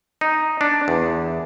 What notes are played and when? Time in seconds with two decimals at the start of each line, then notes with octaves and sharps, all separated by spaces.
0.21 D#4
0.61 D4
0.88 E2